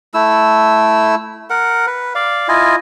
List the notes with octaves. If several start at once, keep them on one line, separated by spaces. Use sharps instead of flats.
A3 E4 E6
A#4 F#5
B4
D5 F5
E4 F4 D#5 G#5